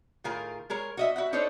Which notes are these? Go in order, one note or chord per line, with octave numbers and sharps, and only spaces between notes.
A2 D#3 F4 G#4 A#4
G#3 G#4 A#4 C#5
F#4 D#5 E5
F#4 E5 F#5
D4 D#4 A4 C5 C#5